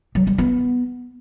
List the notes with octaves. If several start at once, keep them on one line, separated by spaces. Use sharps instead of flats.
F#3
G3
B3